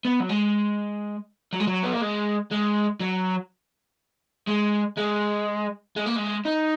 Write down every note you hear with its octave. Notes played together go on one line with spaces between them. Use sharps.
B3
F#3
G#3
F#3
G#3
F#3
B3
A#3
G#3
G#3
F#3
G#3
G#3
G#3
A#3
G#3
D#4